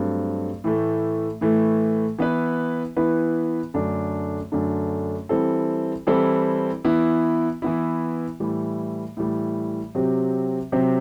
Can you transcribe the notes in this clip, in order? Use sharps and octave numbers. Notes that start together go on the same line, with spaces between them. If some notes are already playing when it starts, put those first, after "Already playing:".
Already playing: G2 F#3 A3 C4
A2 E3 A3
A2 E3 A3
E3 B3 E4 B4
E3 B3 E4 B4
F#2 D3 A3 D4
F#2 D3 A3 D4
E3 G3 C4 E4 A4
E3 G3 C4 E4 A4
E3 B3 E4
E3 B3 E4
A2 E3 G3
A2 E3 G3
C3 F#3 C4 G4
C3 F#3 C4 G4